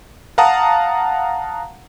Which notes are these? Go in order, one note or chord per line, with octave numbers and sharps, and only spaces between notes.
F5 F#5 A5 A#5 D#6